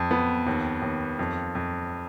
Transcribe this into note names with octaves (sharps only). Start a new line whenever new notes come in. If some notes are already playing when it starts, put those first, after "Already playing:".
Already playing: F2
B3
D#2
D#2
F2
F2